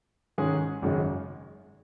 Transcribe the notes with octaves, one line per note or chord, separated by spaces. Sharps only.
G#2 D#3 G#3 C#4 G#4
G#1 F#2 C#3 G#3